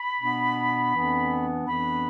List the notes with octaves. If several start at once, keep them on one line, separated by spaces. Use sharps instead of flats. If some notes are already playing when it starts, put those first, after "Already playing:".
Already playing: B5
B2 B3 D4
F2 E3 B3 D4
F2 E3 B3 D4 B5